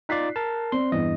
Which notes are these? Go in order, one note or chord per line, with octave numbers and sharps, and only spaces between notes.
D#4 F4 D5 F#6 B6 C7
A#4 A5
C4 D5 C6
E2 G2 D#5